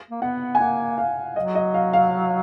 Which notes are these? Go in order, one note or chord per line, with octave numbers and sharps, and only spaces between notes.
A#3
B3 F#5
G#5
A#3 F#5
F5
F#3 D#5
D#5
F5
F5